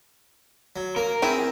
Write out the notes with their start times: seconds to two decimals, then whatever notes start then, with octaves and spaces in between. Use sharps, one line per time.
0.76 F#3
0.96 A#3 A#4
1.22 C4 E4 G#4 G5